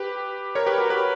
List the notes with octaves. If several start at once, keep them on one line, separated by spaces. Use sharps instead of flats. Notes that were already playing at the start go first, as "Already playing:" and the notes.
Already playing: G4 B4
A#4 C#5
G4 B4
F#4 A#4
G4 B4